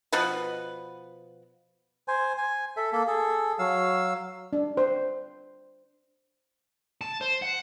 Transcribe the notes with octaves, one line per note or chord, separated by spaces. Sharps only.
B2 F3 B3 B4
C5 G#5
G#5
A4 E5
A#3 A4
G#4 A4
F#3 F5 E6
D4
C5
A5
C5
F#5